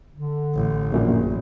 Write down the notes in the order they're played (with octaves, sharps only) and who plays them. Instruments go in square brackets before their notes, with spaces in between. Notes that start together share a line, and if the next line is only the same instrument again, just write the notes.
[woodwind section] D3
[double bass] A1
[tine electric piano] A#1 F#2 A#2